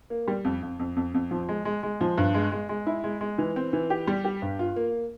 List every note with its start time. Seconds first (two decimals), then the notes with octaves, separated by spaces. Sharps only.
0.10 A#3
0.27 G3
0.45 F2
0.62 F2
0.79 F2
0.96 F2
1.14 F2
1.31 F3
1.49 G#3
1.65 G#3
1.83 G#3
2.01 F3
2.18 G2
2.34 G#3
2.52 G#3
2.69 G#3
2.87 E4
3.04 G#3
3.21 G#3
3.38 E3
3.56 C4
3.73 E3
3.90 G4
4.07 G3
4.24 G4
4.42 G2
4.59 F4
4.76 A#3